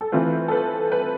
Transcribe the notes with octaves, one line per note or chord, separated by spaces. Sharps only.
A4
E3 A3 C4 F4 B4
A4
B4
B4